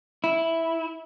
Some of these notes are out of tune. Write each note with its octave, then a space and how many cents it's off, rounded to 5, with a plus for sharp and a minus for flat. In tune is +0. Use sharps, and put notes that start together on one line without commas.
E4 -5